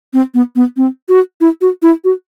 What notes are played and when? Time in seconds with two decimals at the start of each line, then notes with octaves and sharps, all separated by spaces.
0.13 C4
0.34 B3
0.56 B3
0.77 C4
1.09 F#4
1.41 E4
1.61 F#4
1.82 E4
2.04 F#4